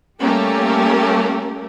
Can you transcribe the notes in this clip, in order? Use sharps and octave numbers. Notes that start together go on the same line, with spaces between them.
G3 A3 A#3 C#4 G4 A#4